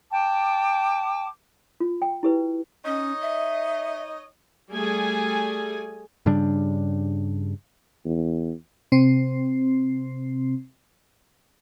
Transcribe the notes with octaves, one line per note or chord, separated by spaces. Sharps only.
G5 A5 D6
F4
G5
E4 G4 B4
C#4 D#4 C#5 D#5
E5
G3 A3 G#4 G#5
G2 C#3 G3 D4
E2
C3 C4